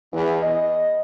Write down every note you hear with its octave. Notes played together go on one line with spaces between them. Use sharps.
E2
D#5